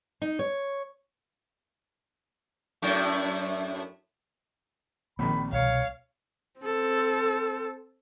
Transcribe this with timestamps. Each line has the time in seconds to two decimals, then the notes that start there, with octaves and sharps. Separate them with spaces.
0.22 D#4
0.39 C#5
2.82 F#2 A2 D4
5.19 A#1 D#3 A#3 C4 B5
5.53 C2 B2 C#5 F5
6.59 C4 A4